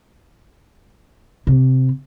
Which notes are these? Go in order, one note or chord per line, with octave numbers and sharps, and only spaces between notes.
C3